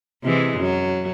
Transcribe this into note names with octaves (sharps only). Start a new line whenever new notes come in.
C3 E3 G#3
F#2 F#3